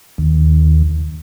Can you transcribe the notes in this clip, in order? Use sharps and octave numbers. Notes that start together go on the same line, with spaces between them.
D#2